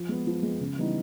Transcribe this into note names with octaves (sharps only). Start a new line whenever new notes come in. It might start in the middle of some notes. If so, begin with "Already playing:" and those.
Already playing: F3
G#3 B3
F3
G#3 B3
C#3
E3 G3 B3 D#4